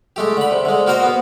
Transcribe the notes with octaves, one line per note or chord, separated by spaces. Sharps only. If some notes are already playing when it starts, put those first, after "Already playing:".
G#3 A3 G4
D3 B5
C3
D3 G#3
A#3 F#4 A#4 C5 D#5
B3